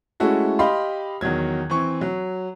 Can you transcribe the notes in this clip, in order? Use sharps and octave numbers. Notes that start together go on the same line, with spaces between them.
G#3 A3 C#4 E4 F#4 A4
G4 D#5 F5 B5 C6
E2 D#3 F#3 G#6
E3 C4 C#6
F#3